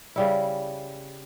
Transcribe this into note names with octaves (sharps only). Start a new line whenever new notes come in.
C#3 G3 E4